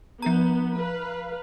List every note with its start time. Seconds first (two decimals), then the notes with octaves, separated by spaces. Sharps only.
0.22 F3 B3 A#5
0.79 B4 F5